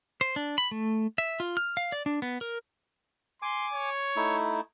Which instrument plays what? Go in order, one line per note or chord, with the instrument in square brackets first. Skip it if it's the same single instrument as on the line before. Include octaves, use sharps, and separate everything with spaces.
[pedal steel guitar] C5
D4
B5
A3
E5
F4
F6
F5
D5
D4
B3
A#4
[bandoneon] G#5 D6 [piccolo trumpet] C6
[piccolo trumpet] C#5
[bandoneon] A3 D#4 E4